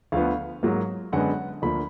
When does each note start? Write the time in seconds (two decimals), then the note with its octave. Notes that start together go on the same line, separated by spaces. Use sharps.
0.12 D2 D3 F3 B3 F5
0.63 G#2 F#3 A#3
1.13 F#2 D3 G#3 B3 F#5
1.62 D2 D3 F3 A#3 B5